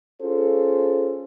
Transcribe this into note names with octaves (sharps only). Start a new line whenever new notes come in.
C#4 F4 G#4 A4 C5